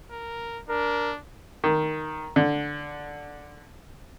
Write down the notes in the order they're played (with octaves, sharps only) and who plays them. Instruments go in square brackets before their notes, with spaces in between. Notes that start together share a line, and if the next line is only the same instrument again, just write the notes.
[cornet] A#4
[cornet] D4 [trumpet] A#4
[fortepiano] D#3
D3